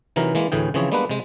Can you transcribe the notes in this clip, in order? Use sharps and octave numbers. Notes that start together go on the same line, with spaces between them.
C3 E3 F#3 D#4 A#4
E3 G#3 A#3
D2 A2 E3 G#4 G5
C#3 E3 F3 C4 G#4 C#5
G3 G#3 A#3 B3 D4 B4
C3 G#3